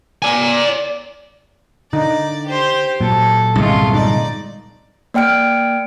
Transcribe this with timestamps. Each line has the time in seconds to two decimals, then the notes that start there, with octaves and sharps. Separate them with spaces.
0.22 D5 G#5
1.93 D3 D#4 D5
2.45 G4 C5
3.00 A#2 F#3 A4
3.55 G1 C2 G#3 A3 F4
3.94 D#4 D5
5.14 A#3 D5 G5 F6 D7